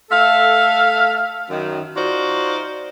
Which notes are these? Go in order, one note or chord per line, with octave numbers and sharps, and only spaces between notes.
A3 A4 E5 F5
F#2 D#3
D#4 F4 F#4 C5 D5